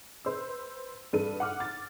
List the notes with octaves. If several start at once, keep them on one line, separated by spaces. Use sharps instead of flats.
B4 C5 E6
G2 A4 B4 D#7
F#5 D6 F6
A6